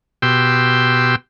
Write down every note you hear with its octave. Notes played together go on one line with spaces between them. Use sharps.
B2 G4 G5 C6 E6